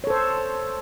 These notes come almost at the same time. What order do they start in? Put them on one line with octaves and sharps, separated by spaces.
C#5 A4 C5